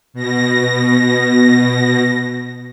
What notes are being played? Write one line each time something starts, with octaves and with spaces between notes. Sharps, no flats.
B2 A#6